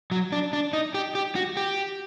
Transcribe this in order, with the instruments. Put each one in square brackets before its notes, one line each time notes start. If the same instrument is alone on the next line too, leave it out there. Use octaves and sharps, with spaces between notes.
[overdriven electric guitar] F#3
D4
D4
D#4
G4
G4
F#4
G4